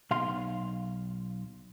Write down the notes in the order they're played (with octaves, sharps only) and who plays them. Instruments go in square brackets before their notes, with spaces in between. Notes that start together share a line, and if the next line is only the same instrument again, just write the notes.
[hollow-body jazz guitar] B1 F5 C6